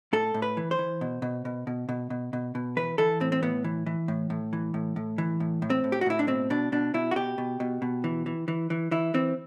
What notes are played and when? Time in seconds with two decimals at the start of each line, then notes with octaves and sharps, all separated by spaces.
0.13 A2 A4
0.34 A2
0.42 B4
0.57 E3
0.71 C5
0.79 E3
1.01 B2
1.22 B2
1.45 B2
1.67 B2
1.89 B2
2.10 B2
2.33 B2
2.55 B2
2.77 E3 B4
2.98 E3 A4
3.20 A2 C4
3.32 C4
3.42 A2 B3
3.64 E3
3.86 E3
4.08 A2
4.30 A2
4.53 E3
4.74 A2
4.96 A2
5.18 E3
5.40 A2
5.62 A2
5.70 C4
5.84 A2
5.92 G4
6.01 F#4
6.06 A2 E4
6.19 D4
6.28 B2 C4
6.50 B2 D4
6.72 B2 D4
6.94 B2 E4
7.11 F#4
7.16 B2 G4
7.38 B2
7.60 B2
7.82 B2
8.04 E3
8.26 E3
8.48 E3
8.70 E3
8.91 E3 E4
9.14 E3 C4